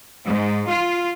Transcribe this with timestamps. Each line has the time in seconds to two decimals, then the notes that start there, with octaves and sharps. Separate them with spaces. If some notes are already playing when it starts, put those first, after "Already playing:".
0.24 G#2
0.68 F4